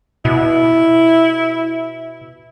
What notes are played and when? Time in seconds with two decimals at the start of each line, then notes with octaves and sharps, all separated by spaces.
0.25 B2 E4